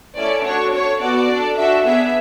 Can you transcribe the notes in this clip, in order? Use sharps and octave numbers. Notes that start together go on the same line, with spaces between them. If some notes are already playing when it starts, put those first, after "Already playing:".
A3 C#4 E4 A4 D5
D4 F#4 A4 C#5
D4 A4 C#5
B3 F#4 A4 D5
D4 A4
D4 F#4 A4 E5
B3 D4 G#4 E5